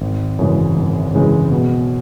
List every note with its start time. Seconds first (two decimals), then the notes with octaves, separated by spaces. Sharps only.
0.01 G#1
0.39 F#2 C#3 E3 G#3
0.76 G#1
1.13 F#2 C#3 E3 G#3
1.52 B2